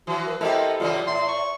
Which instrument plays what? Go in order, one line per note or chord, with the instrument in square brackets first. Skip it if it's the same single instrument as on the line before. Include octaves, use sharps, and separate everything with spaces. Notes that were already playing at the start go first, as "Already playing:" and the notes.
[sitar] E3 F#3 [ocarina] F#4
[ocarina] A#4
[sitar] B3 C4 A#4 [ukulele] E4 G4 [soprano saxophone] A4 [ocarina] D#5
[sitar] F#2 C3 E3 [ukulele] F4 [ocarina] D5
[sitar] A2 [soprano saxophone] C6
[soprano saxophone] C#6